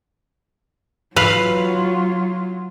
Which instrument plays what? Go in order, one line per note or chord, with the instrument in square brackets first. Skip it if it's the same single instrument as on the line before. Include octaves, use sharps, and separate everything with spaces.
[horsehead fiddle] F#3 F4 [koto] B4 F5